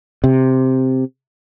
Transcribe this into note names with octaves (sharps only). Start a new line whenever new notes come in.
C3